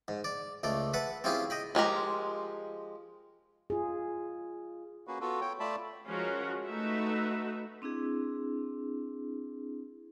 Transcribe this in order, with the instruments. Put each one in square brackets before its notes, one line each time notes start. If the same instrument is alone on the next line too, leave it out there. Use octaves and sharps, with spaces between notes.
[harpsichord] G#2
D5
C#2 A3 D5
B4 E5 F#5 A5
C4 C#4 E4 F4 G4 G#4
D#5 G5 B5
[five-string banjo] F3 G#3 G4 A#4
[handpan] F4 G#4
[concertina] A#3 C#4 F#4 G#4 B4
B3 F4 F#4 A4
C#5 G5
A3 F4 D5 E5 A5 B5
[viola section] F3 G#3 C#4 F#4 A#4
A3 D#4 F#4 A4 B4 E5
[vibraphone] C4 D4 E4 G#4